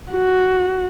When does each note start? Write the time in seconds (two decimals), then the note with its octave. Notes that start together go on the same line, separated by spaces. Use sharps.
0.11 F#4